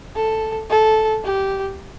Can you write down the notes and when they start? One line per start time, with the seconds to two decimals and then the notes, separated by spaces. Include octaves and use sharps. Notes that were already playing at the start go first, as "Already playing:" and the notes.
0.16 A4
0.70 A4
1.24 G4